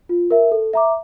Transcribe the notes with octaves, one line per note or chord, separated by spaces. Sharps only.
F4
A#4 E5
A4
E5 A#5 D6